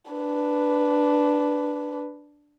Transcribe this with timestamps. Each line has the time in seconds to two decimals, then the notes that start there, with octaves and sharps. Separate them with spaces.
0.11 D4 B4